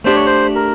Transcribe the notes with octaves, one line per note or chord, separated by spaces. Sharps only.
A3 D4 G4 C5
C#5
C5
A#4